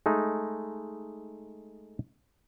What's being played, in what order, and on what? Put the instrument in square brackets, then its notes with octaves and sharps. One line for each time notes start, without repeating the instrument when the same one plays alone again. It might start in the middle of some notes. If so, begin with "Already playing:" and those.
[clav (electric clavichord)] G#3 A3 D#4